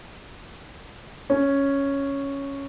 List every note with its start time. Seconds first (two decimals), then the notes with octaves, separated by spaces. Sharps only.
1.30 C#4